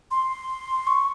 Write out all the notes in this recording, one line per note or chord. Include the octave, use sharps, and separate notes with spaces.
C6
C#6